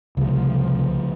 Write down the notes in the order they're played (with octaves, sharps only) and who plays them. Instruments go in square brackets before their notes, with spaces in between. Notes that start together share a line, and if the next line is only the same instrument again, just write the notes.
[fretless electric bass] C2 [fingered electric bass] C#3 A3 [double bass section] F3